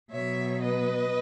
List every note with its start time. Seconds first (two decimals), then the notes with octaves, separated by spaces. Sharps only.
0.11 B2 F#3 C#5 E5
0.61 B4 D#5